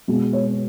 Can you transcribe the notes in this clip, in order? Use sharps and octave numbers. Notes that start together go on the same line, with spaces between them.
B2 G#3 B3
C#5